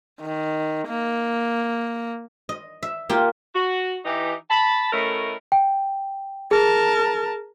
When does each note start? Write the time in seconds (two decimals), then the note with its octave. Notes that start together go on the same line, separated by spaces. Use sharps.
0.21 D#3
0.88 A#3
2.49 D#5
2.83 E5
3.09 A#3 F4 G4
3.55 F#4
4.05 E3 D#4 G4
4.50 A5 B5
4.93 A2 A3 C#4 A#4 B4 D#5
5.52 G5
6.51 G#4 A#4 A5